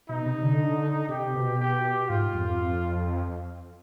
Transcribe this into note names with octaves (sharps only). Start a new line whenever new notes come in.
B2 D#4
C3
D3
C3 G4
B2
G4
G#2 F4
F2